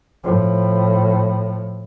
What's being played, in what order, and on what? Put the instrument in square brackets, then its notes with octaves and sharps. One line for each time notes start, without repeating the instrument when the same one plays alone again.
[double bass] A2 F3